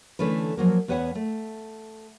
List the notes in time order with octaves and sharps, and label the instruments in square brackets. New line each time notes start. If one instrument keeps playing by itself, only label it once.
[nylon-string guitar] D3 E3 A3 C#4 B4
F3 F#3 A#3
E2 B3 B4 C#5 F#5
A3